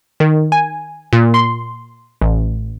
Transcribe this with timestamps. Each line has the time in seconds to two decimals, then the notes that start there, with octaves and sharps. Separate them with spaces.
0.20 D#3
0.52 G#5
1.13 A#2
1.34 C6
2.22 A1